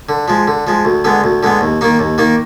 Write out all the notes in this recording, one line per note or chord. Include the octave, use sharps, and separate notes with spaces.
D3
F3 G#3
D3
F3 G#3
D2
D3 G#3 B3
D2
D3 G#3 B3
D#2
D#3 A#3 D#4
D#2
D#3 A#3 D#4